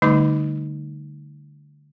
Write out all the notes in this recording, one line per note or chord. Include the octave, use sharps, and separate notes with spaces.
D3 G3 A3 D#4 C6 D6